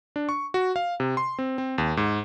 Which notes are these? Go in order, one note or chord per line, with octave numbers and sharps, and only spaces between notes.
D4
C#6
F#4
F5
C3
C6
C4
C4
D#2
G#2